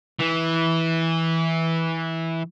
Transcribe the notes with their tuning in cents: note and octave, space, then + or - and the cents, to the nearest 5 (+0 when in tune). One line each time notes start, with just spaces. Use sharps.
E3 -10